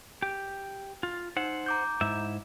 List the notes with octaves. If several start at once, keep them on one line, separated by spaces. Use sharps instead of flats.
G4
F4
D#4 C5 F#5
A#5 D6 G6
G#2 E4 E5